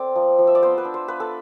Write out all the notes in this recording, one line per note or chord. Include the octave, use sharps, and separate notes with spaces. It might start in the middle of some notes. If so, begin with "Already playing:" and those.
Already playing: C4 A4 D5
F3
F3
E5
D5
B3 C5
B4
D4
C5
F4 B4
A4